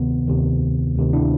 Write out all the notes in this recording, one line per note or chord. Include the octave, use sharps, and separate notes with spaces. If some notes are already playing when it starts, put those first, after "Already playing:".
Already playing: D2 C3 D#3 B3
D2 C3 D#3
D2 C3 D#3
D4 E4